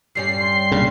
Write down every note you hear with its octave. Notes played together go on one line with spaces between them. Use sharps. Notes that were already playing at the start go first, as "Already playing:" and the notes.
G2 G3 C#4 C7
C6
B1 A#2 C#3